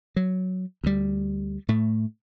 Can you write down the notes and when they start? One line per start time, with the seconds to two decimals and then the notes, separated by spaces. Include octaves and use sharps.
0.16 F#3
0.84 D2 G3
1.68 A2 A3